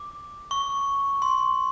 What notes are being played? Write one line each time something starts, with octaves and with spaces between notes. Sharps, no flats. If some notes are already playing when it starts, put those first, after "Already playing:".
Already playing: D6
C#6
C6